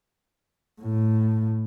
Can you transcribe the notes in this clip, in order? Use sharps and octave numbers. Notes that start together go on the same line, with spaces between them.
A2